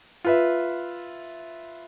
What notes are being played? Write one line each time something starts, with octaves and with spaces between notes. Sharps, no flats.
F4 B4 E5